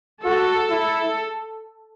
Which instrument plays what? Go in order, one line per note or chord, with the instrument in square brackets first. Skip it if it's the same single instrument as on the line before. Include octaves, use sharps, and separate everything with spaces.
[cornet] F#4 [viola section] A4
[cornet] E4